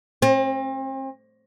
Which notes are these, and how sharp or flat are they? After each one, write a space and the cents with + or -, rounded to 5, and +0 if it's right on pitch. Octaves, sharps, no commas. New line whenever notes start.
C4 +40